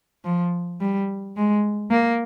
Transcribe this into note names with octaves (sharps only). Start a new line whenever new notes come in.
F3
G3
G#3
A#3